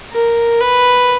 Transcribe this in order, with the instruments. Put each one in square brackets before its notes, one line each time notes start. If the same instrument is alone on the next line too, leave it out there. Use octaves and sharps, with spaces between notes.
[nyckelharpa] A#4
B4